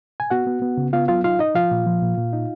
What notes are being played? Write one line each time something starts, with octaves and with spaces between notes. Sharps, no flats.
G#5
B3 F#4 F#5
B3
B3
C#3
B3 F4 F5
F#3 F4 F5
D#4 F4 F5
D#4 D#5
F3 F4 F5
A#2
F3
A#2
A#2
D#4